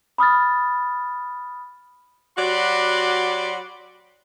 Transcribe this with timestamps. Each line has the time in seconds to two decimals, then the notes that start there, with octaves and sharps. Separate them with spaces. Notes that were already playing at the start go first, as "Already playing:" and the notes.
0.18 B5 D#6 F6 A6
2.38 F#3 F#4 G4 D5 B5 C6